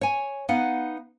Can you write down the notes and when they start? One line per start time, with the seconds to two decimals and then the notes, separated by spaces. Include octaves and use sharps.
0.01 C#5 G#5
0.49 B3 D#4 F5 F#5